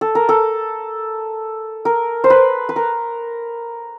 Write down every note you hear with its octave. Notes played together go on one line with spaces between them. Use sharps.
A4
A#4
A4
A#4
C5
B4
B4
A#4